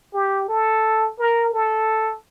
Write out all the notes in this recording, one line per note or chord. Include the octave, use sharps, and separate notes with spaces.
G4
A4
A#4
A4